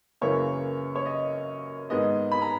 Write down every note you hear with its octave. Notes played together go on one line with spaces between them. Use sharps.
F#2 C#3 E3 A#3 C#5
C#5
D#5
G#2 D#3 G#3 B3 D#5
B5
A#5